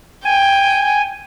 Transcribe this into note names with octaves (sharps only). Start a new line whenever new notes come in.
G5 G#5